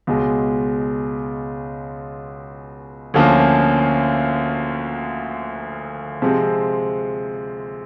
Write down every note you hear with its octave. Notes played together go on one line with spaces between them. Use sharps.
C#2 B2 G#3
D2 D3 F3 A#3 C#4
C3 F3 G#3 C4